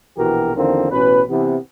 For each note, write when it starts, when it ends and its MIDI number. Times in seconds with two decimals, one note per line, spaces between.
0.17 0.52 34
0.17 0.52 47
0.17 0.52 52
0.17 0.52 66
0.17 0.52 67
0.17 0.52 70
0.55 0.90 40
0.55 0.90 50
0.55 0.90 51
0.55 0.90 53
0.55 0.90 58
0.55 0.90 60
0.91 1.22 33
0.91 1.22 47
0.91 1.22 61
0.91 1.22 71
1.29 1.55 48
1.29 1.55 52
1.29 1.55 59